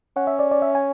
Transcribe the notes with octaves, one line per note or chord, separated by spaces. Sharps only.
C#4 F#5
E5
D5
D5
E5
G#5